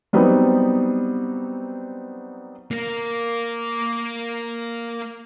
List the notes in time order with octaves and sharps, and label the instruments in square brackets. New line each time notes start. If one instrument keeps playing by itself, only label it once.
[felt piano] F#3 G3 B3 C4 D#4
[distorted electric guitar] A#3 A#4